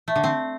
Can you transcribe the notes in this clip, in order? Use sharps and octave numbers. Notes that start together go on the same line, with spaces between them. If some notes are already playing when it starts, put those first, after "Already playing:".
A3
D3
C4